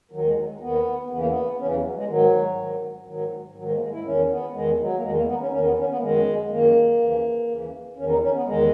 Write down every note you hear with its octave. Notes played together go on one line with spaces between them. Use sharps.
D#2 D#3 F#3
G#3
F#3
D#2 D#3 B3
E2 C#3 E3 B3
A#3
B3
E2 C#3 E3 C#4
F#3
F#3
G#3
G#2 D#3 F#3
G#2 D#3
G#2 D#3 F#3
G#2 D#3 F#3
G#3
A#3
G#3
E4
E2 D#3 C#4
B3
E2 D#3 G#3
F#3
A#3
E2 D#3 G#3
A#3
B3
D#4
C#4
E2 D#3 C#4
B3
C#4
B3
A#3
F#2 D#3 G#3
F#2 D#3 A#3
D#2 C#3 E3
D#2 C#3 E3
E2 D#3 C#4
D#4
C#4
B3
E2 D#3 G#3